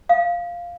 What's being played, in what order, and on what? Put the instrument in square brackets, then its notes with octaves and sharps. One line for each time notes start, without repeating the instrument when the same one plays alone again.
[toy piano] F5